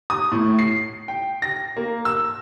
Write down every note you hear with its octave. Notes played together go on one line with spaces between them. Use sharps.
D#6
A2
C7
G5
A#6
A#3
E6